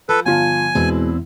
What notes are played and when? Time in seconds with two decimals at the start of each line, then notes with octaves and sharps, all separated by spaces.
0.09 F3 A4 B4
0.26 G1 F4 G#5 A5
0.75 E2 B2 G#3 C4 E4